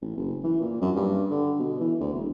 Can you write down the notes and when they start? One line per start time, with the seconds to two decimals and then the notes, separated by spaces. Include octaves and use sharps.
0.02 A1
0.17 F#1
0.44 E3
0.61 A#2
0.81 F#2
0.96 G2
1.31 D3
1.59 B2
1.80 E3
2.00 D2
2.14 E1